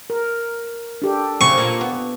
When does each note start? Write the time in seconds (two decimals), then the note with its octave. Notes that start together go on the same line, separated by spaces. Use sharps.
0.10 A#4
1.02 D4 G4 A4
1.41 C#3 F#3 C4 C#6
1.58 A#2
1.81 B3